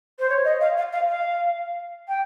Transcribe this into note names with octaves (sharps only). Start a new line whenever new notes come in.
C5
C#5
D#5
F5
F5
F5
F5
G5